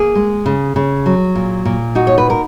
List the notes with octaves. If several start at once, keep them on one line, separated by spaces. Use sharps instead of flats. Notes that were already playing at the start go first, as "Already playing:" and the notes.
Already playing: A#3 G#4
G#3
C#3
C#3
F#3
A#2
A#2
D#4 F#4
C#5
B4
A#4